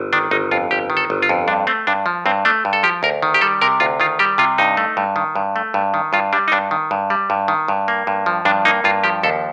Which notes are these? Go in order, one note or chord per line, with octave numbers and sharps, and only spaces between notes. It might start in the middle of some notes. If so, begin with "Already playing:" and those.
Already playing: G1
D#3 D4
G1 D#4
F2 F4
G1 G4
D#3
A4
G1
F4
F2
G2 D4
A3 C4
G2 D4
F3
G2 C4
A3 D4
G2
A4
F3 G4
D2 A#4
D#3
G4
G3 A4
C3 A#4
D2 F4
D#3 F4
G3 G4
C3 F4
G2 D#4
A3
G2
D#3
G2
A3
G2
D#3
G2 F4
G3 D4
D#4
G2 D4
D#3
G2
G3
G2
D#3
G2
A#3
G2
F3
G2 D4
A#3 D#4
G2 F4
F3 G4
D#2 A4